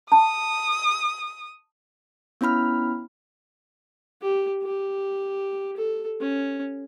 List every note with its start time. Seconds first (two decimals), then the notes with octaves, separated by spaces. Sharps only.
0.12 A5 D#6
2.41 B3 C#4 E4 B5 F6
4.22 G4
4.62 G4
5.77 A4
6.20 C#4